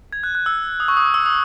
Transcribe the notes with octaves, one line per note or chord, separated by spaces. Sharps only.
G#6
F#6
F#6
E6
D#6
C#6
D#6
E6
D#6